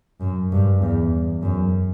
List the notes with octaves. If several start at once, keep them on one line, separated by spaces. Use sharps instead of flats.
F#2
G2
E2
F#2